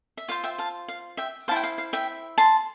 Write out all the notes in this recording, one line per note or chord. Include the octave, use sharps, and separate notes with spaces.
E5
F4 C5 F5
E5 G5
F5 A5
F5
E5 G5
E4 A4 C5 F5 A5
G5
F5
F5
E5 G5
A5 C6